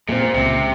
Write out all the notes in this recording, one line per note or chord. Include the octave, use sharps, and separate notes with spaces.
A#2 G#3 C4
C#2 C3